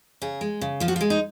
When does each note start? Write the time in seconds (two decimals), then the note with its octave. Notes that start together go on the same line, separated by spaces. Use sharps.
0.22 C#3 G#4
0.41 G#3
0.61 C#3
0.80 F3 F4
0.88 F#4
0.96 F4
1.01 G#3
1.10 D#4